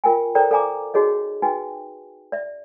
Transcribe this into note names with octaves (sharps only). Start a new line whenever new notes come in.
F4 A#4 G5 G#5
A4 A#4 C5 D5 G5 A#5
A4 D5 F5 G#5 A#5 D6
D#4 F#4 G#4 C#5 D#5
D#4 F#4 B4 G5 G#5
D5 E5